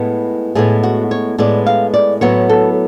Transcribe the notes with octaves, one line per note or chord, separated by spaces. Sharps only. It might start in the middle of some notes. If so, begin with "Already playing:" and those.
Already playing: A2 G#3 B3
A2 G#3 B3 G#4
F#4
C#5
A2 G#3 B3 D5
F5
D5
A2 F#3 B3 C#5
A4